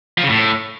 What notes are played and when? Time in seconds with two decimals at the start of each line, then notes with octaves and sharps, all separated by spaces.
0.18 F3
0.23 C#3
0.29 A2